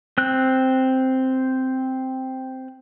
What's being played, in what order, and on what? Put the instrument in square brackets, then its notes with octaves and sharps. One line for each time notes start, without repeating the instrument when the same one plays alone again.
[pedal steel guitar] C4 F#6